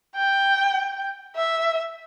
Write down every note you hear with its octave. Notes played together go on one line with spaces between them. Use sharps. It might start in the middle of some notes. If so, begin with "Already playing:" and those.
G5
E5